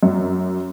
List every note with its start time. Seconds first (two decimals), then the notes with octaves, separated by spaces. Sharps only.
0.03 F#2